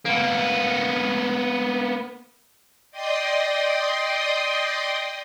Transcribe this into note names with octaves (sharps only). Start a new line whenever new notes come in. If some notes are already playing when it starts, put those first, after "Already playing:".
A#3 B3
D5 D#5 G5 C6 D#6